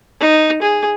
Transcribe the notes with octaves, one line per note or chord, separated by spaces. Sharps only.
D#4
G#4